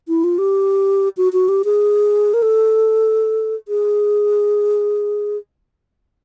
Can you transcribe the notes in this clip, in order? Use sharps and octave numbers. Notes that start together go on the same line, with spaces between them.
E4
F4
G4
F#4
F#4
G4
G#4
A#4
A4
G#4